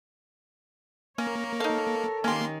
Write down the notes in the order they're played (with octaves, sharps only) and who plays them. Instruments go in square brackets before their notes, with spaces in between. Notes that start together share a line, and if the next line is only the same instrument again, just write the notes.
[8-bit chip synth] A#3 [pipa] C#4 [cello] A#4 C#5
[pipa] D#4 F5 [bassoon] A4
[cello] D#3 [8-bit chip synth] A#3 C6 [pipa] C#4 G4